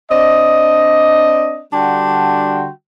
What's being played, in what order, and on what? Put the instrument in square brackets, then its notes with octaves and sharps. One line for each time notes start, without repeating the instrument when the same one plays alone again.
[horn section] C4 D4 D5 D#5
D3 G3 D4 F#4 G5 C6